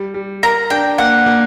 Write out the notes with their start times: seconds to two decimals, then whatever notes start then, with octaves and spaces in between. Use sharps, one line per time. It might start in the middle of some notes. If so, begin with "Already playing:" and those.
Already playing: G3
0.14 G3
0.43 A#4 A#5
0.70 D4 G5
0.98 A#3 F#5
1.26 A#3